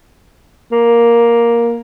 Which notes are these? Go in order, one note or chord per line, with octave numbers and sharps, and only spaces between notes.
A#3